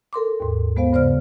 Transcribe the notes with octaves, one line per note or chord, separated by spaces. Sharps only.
A4 A#4 C6 D6
D#2 G#2
G#3 B3 C5 F5
G2 C#3 C5 D5 F6